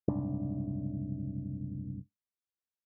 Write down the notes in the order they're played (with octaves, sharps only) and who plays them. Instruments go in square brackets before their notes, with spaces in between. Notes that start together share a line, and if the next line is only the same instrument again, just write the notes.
[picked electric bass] F#1 C2 G#2 D4